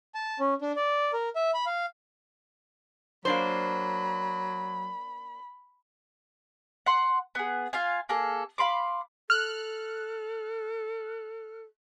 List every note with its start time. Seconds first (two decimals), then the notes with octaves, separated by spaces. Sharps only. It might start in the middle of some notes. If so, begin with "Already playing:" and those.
0.15 A5
0.40 C#4
0.62 D4
0.76 D5
1.13 A#4
1.36 E5
1.54 B5
1.66 F5
3.25 F#3 A#3 D4 C5 B5
6.86 F#5 C6
7.35 B3 G#4
7.73 F4 F5 G#5
8.09 A#3 G#4 A4
8.58 F5 B5 C6 D6
9.30 A4 F6 F#6